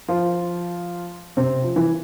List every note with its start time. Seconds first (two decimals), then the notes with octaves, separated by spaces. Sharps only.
0.08 F3 F4
1.37 C3 C4
1.63 F3
1.76 E3